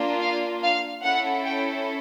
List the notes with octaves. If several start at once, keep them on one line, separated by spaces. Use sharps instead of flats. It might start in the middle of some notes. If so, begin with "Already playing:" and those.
Already playing: A#3 D4 F4
F5
F5
C#4 E4 A4 F#5
G5